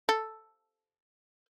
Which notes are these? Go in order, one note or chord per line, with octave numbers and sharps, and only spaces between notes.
A4